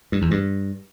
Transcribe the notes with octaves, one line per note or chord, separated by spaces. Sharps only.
G2
E2
G2